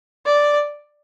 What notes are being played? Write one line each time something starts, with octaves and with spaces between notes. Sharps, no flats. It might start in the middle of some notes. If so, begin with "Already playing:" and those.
D5